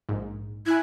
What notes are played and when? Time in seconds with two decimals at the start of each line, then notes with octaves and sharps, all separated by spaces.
0.09 A#1 G#2
0.66 E4 G#5 F#6 G#6